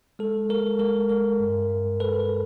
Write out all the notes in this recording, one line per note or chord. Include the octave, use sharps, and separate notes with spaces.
G#3 A4
G#3 A#4
G#3 A#4
G#3 A#4
G2
G2
G#3 A4 B4